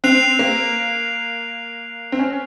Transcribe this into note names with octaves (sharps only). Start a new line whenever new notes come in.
C4 F#6 C7 F7
A#3
C4
C#4